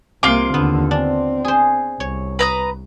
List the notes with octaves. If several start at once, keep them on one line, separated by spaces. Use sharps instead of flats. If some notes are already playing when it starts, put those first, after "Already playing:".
C2 C3 A#3 F4 C6 D6
D#2 D3 B3
C4 D4
G#4 C5
C2 C#5
B4 A#5 D#6